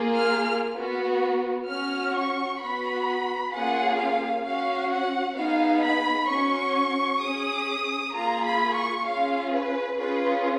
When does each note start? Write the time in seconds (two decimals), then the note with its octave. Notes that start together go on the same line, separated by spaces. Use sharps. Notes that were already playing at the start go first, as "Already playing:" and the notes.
Already playing: A#3 F4 G#4
0.15 F6
0.76 B3 F#4
1.68 C#4 F#4 F6
2.15 C#6
2.60 B3 F#4 B5
3.52 A#3 C#4 F4 G#4 F#5
3.98 F5
4.45 C#4 F#4 F5
4.91 F#5
5.36 B3 D#4 G#4 F5
5.83 B5
6.28 C#4 F#4 C#6
7.21 C#4 G#4 D#6
8.14 A#3 F4 G#4 A#5
8.44 B5
8.74 C#6
9.05 C#4 F4 G#4 F5
9.52 B4
9.98 C#4 F4 G#4 B4